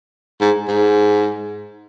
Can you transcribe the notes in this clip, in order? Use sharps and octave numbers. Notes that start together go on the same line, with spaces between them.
G#2
G#2